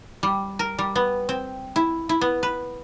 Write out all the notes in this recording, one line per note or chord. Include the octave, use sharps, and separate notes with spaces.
G3
A#4
G3
B3
C4
E4
E4
B3
B4